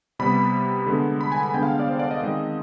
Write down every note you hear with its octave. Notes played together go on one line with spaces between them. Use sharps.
C3 G3 B3 B5
D3 G#3 B3
B5
G#5
B5
D3 G#3 B3 G5
F5
D5
C5
D5
D#5
D#3 G#3 C4